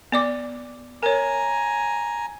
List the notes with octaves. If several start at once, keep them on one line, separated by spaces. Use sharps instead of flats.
B3 D5 D6
A#4 C#5 G#5 A#5